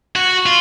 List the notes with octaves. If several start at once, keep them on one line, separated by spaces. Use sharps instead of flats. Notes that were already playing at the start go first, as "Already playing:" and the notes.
F#4
F4